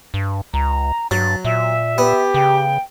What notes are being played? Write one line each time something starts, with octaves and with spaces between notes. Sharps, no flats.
G2
C#2 A#5
G2 F#3 A6
A#2 E5
B3 G4
C#3 G5